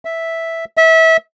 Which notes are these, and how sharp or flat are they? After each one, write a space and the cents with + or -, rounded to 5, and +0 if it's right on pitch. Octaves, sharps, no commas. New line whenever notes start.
E5 -5
E5 -25